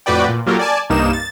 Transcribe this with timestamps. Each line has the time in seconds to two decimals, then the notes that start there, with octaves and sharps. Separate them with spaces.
0.06 F2 A2 F#4 B4 D5 G5
0.28 A#2
0.46 F#3 A#3 F4 G4 A4 A#4
0.59 D5 G#5 A5
0.90 C2 G2 A#3 D#4 E7
1.13 A6